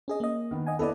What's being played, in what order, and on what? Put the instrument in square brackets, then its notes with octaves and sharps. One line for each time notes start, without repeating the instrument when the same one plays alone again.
[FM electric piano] C#4 G#4 D#5
A#3 D#5
[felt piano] D#3 B3
[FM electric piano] D#5 F#5 G#5
[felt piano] B3 E4 D#5 [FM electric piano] A4 D5